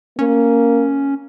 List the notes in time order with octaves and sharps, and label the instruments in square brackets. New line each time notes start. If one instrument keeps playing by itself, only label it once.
[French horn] A#3 [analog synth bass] C#4